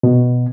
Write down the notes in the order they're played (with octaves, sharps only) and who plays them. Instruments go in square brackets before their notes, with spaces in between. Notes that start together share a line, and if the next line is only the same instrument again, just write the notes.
[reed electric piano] B2